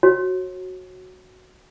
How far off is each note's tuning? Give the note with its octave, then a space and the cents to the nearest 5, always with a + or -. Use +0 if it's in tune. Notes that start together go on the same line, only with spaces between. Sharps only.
F#4 +0 C#5 -35